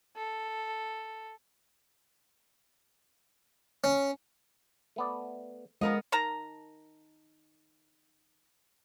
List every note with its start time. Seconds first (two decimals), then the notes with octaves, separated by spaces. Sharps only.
0.16 A4
3.84 C#4
4.96 A3 B3 D5
5.81 F3 G#3 B3 A#4 D#5
6.12 D#3 A#4 A5 A#5